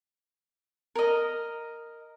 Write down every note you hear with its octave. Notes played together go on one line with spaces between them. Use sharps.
A#4 D#5